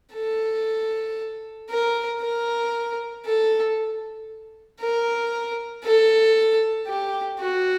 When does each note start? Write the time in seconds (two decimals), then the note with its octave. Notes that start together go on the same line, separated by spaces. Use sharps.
0.14 A4
1.70 A#4
2.22 A#4
3.25 A4
4.81 A#4
5.83 A4
6.87 G4
7.39 F#4